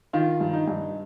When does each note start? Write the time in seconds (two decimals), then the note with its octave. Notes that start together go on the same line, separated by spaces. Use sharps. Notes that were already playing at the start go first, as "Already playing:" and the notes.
0.13 D#3 F4
0.40 G2
0.53 D#4
0.68 G2